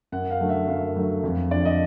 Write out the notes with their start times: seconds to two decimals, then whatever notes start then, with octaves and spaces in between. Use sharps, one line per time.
0.12 F#2 F#5
0.30 F5
0.40 D3 F#3 A3
0.49 E5
0.68 F#2 F5
0.95 D3 F#3 A3
1.23 F2
1.51 D3 F3 D5
1.65 D#5